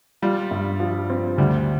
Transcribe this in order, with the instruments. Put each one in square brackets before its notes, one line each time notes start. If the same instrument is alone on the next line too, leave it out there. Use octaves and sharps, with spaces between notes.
[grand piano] G3 [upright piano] F4
[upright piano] G2
F3
C4
[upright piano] D2 [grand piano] G3